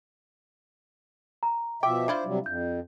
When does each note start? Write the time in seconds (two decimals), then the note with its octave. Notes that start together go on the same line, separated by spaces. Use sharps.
1.43 A#5
1.83 B2 F3 E5 G5 D6
2.08 D4 E4 F4 C5
2.25 C3 F#3 G3
2.46 F2 G6